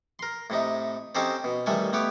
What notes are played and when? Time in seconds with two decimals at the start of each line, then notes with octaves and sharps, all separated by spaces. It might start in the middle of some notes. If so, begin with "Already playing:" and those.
0.19 A#4 C6
0.50 A2 C3 D#4
1.15 C4 C#4 D#4 G4 A4 C5
1.44 B2
1.66 A1 D#3 G3 A3 A4 G#5
1.93 A3 B3 G4 C#5 D6